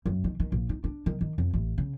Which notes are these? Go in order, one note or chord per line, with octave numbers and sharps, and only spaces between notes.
F#2
D#3
D#3
A#1
D#4
D4
D#3
D#3
F2
A1
C#3